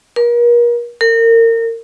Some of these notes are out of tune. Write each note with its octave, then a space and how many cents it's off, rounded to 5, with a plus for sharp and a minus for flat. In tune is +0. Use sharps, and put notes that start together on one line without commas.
A#4 +40
A#4 -30